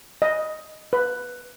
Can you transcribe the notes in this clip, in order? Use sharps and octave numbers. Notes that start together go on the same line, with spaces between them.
D#5
B4